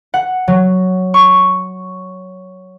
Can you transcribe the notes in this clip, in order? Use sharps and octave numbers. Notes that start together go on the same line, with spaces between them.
F#5
F#3
C#6